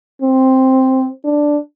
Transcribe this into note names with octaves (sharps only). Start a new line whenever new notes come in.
C4
D4